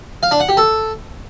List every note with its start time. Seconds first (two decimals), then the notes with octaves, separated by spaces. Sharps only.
0.23 F5
0.31 D4
0.40 F#5
0.49 G4
0.57 A4